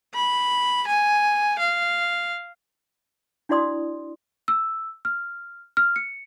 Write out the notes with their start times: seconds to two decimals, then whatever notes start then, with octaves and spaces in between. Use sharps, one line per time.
0.14 B5
0.87 G#5
1.59 F5
3.49 D4 E4 F#4 D5 C6 D#6
4.48 E6
5.05 F6
5.77 F6
5.96 C#7